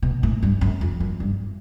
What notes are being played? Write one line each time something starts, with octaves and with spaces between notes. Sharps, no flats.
B2
A2
G2
F#2
F2
F#2
G2